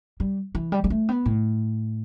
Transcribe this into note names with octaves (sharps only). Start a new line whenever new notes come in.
G3
E3
G3
G3
A3
B3
A2